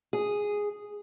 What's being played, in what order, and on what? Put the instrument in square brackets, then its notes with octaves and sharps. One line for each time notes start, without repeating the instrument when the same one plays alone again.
[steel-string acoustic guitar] G#4